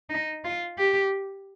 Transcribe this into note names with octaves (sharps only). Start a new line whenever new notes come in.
D#4
F4
G4